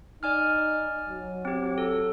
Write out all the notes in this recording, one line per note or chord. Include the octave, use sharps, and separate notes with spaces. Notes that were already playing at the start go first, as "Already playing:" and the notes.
D#4 D5 G#5 F6
F#3
C4 G4
A4